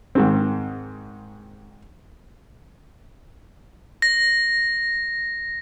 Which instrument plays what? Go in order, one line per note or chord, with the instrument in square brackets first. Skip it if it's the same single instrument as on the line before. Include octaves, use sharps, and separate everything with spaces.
[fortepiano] G#2 D#3 C4
[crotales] A#6